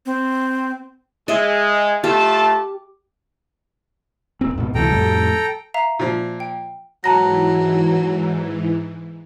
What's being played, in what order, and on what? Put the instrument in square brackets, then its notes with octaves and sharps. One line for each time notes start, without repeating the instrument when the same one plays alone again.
[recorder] C4
[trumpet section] G#3 [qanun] D#5 E5
[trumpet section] A3 F4 A5 [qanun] G4
[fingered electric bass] D#1 C4
D#2 G#2 B2
[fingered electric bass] C#2 C3 E3 [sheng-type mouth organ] A4 G5 A#5
[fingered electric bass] F2 A2 G3
[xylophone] E5 F5 A#5
[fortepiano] A#2 F3
[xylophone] G5
[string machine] G#2 E3 [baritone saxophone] F#3 [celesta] A5 A#5 A#6